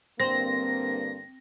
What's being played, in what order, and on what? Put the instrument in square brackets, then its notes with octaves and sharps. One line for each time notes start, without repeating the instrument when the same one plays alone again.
[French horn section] G2 D3 A#3 [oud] C4 [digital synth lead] A#6